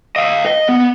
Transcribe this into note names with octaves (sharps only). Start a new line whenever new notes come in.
D#5 F5
D#5
B3